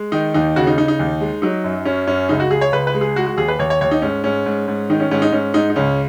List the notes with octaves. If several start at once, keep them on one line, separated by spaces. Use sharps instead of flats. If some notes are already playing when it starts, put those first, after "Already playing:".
Already playing: G#3
D#3 D#4
D#2 D#4
C#3 F#4
D#4
C#3 D#4
D#4
D#2
G#3
F#3 D#4
F#2
F#2 C#4
F#2 C#4
C#2 D#4
F#4
C#2 G#4
C#5
C#2 B4
B4
G#3
G#4
G#3 F#4
F#4
D#2 G#4
B4
D#2 C#5
C#5
D#2 C#5
D#4
G#2 C#4
G#2 C#4
G#2
G#2
D#3 D#4
C#4
G#2 C#4
D#4
G#2 C#4
G#2 D#4
D#4
C#2 C#4